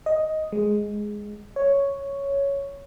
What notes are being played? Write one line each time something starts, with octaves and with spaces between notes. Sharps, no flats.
D#5
G#3
C#5